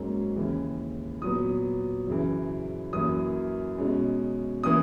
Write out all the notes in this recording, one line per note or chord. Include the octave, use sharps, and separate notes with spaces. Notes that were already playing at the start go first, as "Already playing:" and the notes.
Already playing: G#2 F#3 A#3 C#4
D#2 C#3 E3
A#2 F#3 B3 D#6
F#2 C#3 E3
F#2 E3 A#3 C#4 D#6
B2 G#3 C#4
E3 A#3 C#4 D#6